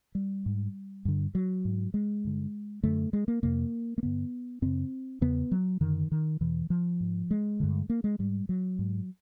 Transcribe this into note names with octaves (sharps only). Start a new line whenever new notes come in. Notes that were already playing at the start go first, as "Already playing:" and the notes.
G3
G#2
G2 D3
F#3
G#2
G#3
G2 D3
F#2 D3 A3
G#3
A#3
F2 C3 A#3
A#3
G2 D3 B3
F#2 C#3 C4
E2 C#3 B3
F#3
F#2 D3 D#3
D#3
E2 B2 E3
F3
G#2
G#3
G2 D3
A#3
G#3
G#2 G3
F#3
G#2